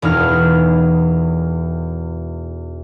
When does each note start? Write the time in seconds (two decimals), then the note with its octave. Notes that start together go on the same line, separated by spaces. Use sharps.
0.02 E1 E2 D#4 F6